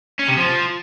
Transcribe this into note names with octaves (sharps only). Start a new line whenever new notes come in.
C#4
C3
F3